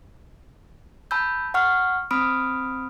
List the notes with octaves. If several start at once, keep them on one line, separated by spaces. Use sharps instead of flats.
A5 B5 E6 G6
F#5 C#6 F6
C4 B5 D#6 F6 D7